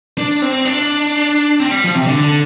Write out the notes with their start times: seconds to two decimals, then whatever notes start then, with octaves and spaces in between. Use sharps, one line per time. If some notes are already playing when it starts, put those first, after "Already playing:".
0.18 D4
0.42 C4
0.65 D4
1.60 C4
1.71 G3
1.84 F3
1.95 C3
2.07 D3
2.23 D3